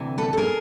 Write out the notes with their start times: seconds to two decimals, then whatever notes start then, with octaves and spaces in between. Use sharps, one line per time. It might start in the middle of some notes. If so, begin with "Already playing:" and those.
Already playing: D2 C3 E3
0.18 A4 B4
0.33 A4
0.37 G#4 A#4